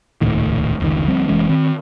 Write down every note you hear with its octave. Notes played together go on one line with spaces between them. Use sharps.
D#1 C#2 A2 D#3
F1 C#2 D#3
D2 F3 G3 C4
F1 E3 G#3 C#4
D#3 C4